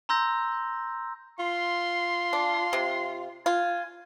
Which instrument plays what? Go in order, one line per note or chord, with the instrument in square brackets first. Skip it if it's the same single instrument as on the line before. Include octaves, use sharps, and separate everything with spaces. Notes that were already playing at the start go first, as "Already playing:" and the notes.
[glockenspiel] A#5 C6 E6 G6 A#6
[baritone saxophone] F4 [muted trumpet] C6
[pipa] D4
C3
[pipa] F4 [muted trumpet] G#5